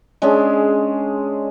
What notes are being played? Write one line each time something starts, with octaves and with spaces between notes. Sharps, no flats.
G#3 C#4 D4 G#4